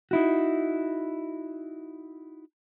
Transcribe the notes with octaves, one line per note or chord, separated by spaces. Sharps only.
D#4 E4 F#4